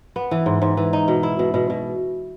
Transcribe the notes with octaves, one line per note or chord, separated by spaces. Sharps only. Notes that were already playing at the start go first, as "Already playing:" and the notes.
B3
E3
G#2
G#2
E3
D#4
B2
E4
B2
B2
B2